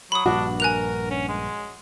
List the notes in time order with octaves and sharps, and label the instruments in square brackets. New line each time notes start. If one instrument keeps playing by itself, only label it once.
[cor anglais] F#3 [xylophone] B5 D#6
[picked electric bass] A#1 G2 [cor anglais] D4 [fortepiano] F#4
[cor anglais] A#4 [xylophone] G#5 F#6 F7
[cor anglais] C#4
G#3